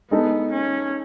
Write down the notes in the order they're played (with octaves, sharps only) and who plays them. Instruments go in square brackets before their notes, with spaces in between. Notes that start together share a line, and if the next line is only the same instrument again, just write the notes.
[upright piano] G#3 D#4 A4 D#5 [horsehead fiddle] B3
[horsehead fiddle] C#4